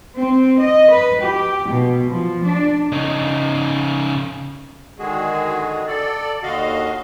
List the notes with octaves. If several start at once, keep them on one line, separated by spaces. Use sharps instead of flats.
C4
D#5
B4
G4
B2
F3
D4
C#3 D#4
D3 D#3 G#3 F#4 G#4
A4 D5
D#2 D3 F#4 D#5 F5